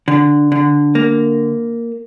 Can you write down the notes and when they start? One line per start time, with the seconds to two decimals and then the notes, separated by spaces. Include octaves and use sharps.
0.08 D3
0.52 D3
0.95 A#3